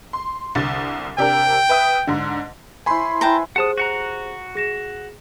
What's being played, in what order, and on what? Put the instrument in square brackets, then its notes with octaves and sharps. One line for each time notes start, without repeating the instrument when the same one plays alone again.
[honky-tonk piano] C6
C2 D3 A6
[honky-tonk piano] C3 D4 A#4 [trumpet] G5
[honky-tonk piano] B4 E5 D#6
G#2 D3
[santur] E4 C5 C#5 [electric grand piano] G#5 B5 C6
[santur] E4 B4 [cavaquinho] G5 A5 A#5
[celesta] G4 G#4 C5 [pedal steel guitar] F#5 A5 D#6
[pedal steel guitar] F#4 F#5 A#5
[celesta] G#4 A#6 E7